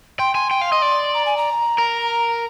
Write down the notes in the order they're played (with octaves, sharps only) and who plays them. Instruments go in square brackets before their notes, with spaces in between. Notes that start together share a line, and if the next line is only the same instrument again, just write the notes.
[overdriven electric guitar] G5 [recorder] C6
[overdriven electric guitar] G#5 [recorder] C6
[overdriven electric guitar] G5
F5
D#5
D5
[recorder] A#5
G#5
A#5
[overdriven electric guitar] A#4